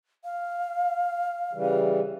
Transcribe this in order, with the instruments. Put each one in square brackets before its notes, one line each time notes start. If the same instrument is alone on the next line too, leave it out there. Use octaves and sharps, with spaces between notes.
[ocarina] F5
[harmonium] C#3 E3 G3